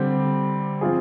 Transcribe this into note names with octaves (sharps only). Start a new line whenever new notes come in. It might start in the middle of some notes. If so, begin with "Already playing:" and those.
Already playing: D3 G3 C4
F3 C4 F4 G#4